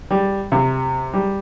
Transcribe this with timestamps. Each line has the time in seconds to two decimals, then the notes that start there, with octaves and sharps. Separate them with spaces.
0.11 G3
0.52 C3
1.14 G3